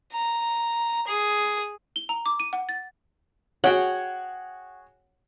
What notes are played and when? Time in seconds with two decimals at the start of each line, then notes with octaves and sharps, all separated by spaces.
0.12 A#5
1.07 G#4
1.96 G7
2.09 A#5
2.26 D6
2.40 D#7
2.53 F#5
2.69 A6
3.64 F#4 G#4 C#5 F#5 G5